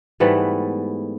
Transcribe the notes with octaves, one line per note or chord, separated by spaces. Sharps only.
G#2 E3 G3 A3 B3